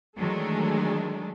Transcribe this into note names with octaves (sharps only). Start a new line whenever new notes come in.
D#3 E3 F#3 G#3 A3 D4